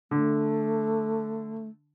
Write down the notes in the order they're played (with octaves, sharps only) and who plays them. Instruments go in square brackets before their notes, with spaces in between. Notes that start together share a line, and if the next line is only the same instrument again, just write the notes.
[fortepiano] D3 [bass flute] A3